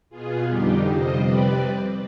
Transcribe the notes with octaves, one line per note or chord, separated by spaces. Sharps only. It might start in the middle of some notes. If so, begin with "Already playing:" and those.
B2 B3 F4 G#4
F2 D3 G3 D#4 G4
F2 C3 G3 C5 D#5
C3 G3 C4 B4 D5